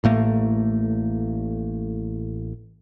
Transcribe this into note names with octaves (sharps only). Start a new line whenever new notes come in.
A1 A2 A3 A#3